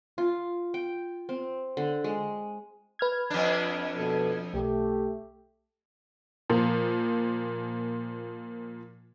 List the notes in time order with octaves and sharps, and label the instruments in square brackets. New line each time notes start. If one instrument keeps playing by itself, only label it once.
[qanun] F4
G5
C4
D3
G#3
[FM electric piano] B4 F6 G#6
[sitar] F2 D4
[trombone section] B2 A4
[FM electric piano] B1 [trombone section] A3 G4
[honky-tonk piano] A#2 F3